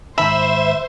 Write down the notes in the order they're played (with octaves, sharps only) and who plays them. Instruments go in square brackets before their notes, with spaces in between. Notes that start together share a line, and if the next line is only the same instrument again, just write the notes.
[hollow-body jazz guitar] G#2 D#3 A#5 [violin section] C5 [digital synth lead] E5 [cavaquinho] B5